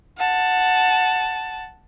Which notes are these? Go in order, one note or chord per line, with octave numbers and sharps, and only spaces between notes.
F#5 A5